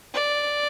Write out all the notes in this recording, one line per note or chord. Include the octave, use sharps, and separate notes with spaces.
D5